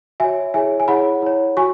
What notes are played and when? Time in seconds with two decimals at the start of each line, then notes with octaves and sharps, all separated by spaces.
0.20 F#4 C#5 E5 G#5
0.54 E4 G#4 C#5 E5 G#5
0.80 G#5
0.88 E4 G#4 C#5 F#5 B5
1.22 E4 C#5
1.57 F#4 G#5 C#6